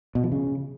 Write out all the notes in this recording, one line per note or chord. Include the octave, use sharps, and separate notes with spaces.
B2
F3
C#3